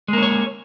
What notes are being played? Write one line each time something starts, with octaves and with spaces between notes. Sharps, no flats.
G#3 A#3 C#4 C#5